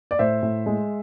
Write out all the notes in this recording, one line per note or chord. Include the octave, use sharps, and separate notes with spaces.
D5
A2 C5 E5
A2
G#3